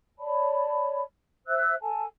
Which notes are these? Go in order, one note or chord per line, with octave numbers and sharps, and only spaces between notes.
C#5 D5 A5 B5
C5 E5 E6 F#6
A4 G#5 A5